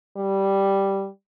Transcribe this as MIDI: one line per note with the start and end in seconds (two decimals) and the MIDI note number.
0.17 1.08 55